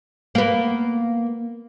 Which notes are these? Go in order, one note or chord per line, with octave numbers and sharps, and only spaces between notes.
A#3 B3